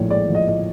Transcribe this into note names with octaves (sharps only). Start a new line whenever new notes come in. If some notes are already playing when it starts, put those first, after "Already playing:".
Already playing: A#1 A2 F3 C#5
G#3 D5
F3
D#5
A2 D#5